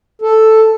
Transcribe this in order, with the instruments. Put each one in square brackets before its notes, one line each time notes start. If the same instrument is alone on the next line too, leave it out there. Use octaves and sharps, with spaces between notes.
[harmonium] A4